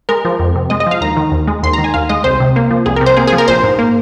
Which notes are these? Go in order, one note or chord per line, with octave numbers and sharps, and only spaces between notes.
G#3 A#4
F3
F2
C3
G#3 D#5
D#5
F3 F5
D#2 A#5
D#3
D#2
G#3
D#2 C6
A#5
D#3
G#5
D#2 F5
G#3 D#5
C2 C5
C3
A#3
F3
C2 G#4
A#4
C3
C5
A#3 G#4
G#4
F3
A#4
A#1 C5
G#2
A#3